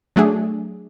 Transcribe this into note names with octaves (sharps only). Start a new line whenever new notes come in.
F#3 A3 D4 G#4